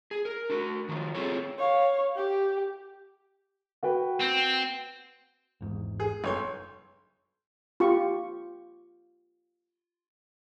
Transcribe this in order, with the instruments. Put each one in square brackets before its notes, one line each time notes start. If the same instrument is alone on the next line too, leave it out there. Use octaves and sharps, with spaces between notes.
[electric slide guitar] G#4
A#4
D4 F#4
D#3 F3 F#3
C4 E4 F4 G#4 A4 C#5
[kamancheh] C#5 F5
G4
[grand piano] F#4 B4 G5
[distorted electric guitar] C4
[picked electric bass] G#1 E2 G#2
[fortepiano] G#4
[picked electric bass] F#1 [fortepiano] B1 C#5 C6
[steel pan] F4 G4 C#6